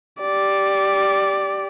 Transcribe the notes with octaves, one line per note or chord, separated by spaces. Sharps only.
G4 D5